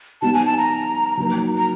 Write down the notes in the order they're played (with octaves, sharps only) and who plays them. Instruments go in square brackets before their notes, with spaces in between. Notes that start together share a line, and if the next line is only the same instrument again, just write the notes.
[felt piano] G3 B3 D#4 G4 [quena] A5
[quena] G#5
A5
A#5
[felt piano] F#3 A#3 D#4 F#4 A#4
[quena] A#5